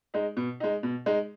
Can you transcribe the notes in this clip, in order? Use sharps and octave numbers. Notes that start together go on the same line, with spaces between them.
G#3 D#4
B2
G#3 D#4
B2
G#3 D#4